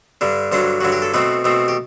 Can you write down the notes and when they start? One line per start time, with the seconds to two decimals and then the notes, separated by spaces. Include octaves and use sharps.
0.21 G2 D3 G3
0.52 G2 D3 F#3 C5
0.81 G2 D3 F#3 F#4
0.92 G4
1.02 A4
1.14 B2 A3 C4 B4
1.44 B2 A3 C4
1.68 G4